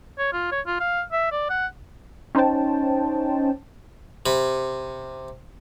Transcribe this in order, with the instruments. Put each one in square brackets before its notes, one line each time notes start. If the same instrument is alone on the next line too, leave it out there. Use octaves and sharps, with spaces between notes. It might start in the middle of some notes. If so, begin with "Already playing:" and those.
[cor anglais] C#5
F4
C#5
F4
F5
E5
D5
F#5
[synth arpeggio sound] C#4 D#4 C5 C#5 G5 A5
[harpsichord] C3 B5